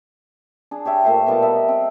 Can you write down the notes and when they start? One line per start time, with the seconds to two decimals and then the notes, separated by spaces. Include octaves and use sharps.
0.71 D4 G#4
0.85 G4 C#5 E5 G5
1.03 A#2 A3 C5 E5
1.27 B2 G3 F4 A5
1.42 A#4 B4 D#5 E5
1.69 C4